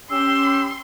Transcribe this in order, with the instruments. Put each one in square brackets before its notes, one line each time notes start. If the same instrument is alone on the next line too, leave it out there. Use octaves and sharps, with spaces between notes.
[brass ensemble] C#4 G4 [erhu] C6 [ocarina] E6